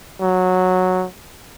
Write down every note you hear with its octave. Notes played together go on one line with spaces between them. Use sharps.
F#3